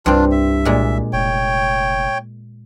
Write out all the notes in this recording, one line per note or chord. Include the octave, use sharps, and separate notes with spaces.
C2 G2 C4 D4 F4
E5
A#2 G#3
F1 C#5 G5